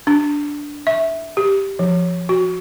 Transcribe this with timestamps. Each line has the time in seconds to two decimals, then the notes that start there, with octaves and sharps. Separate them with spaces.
0.07 D4
0.87 E5
1.37 G4
1.79 F3
2.29 F#4